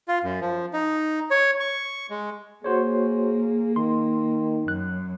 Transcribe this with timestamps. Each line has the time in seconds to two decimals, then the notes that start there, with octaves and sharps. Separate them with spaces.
0.08 F4
0.23 F#2
0.41 F3
0.73 D#4
1.31 C#5
1.60 C#6
2.10 G#3
2.64 A#3 F#4 G#4 C5 C#5
3.76 D#3 C6
4.68 F#2 F#6